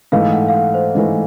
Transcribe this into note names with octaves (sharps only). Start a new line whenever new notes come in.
G#2 E3 A3 F5
F#5
F5
F#5
C5
G#2 E3 A3